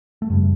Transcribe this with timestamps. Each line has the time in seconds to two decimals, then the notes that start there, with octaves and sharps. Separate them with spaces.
0.22 A3
0.30 F#2 C#3 G3